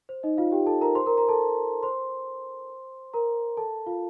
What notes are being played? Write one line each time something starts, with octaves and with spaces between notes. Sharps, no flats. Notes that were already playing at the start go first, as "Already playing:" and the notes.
C5
D#4 D#5
F4 F5
G4 G5
A4 A5
A#4 A#5
C5 C6
A#4 A#5
A#4 A#5
A4 A5
C5 C6
A#4 A#5
A4 A5
F4 F5